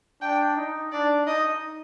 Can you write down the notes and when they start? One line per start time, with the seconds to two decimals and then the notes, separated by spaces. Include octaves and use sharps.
0.22 D4 G5
0.56 D#4
0.92 D4 D5
1.26 D#4 D#5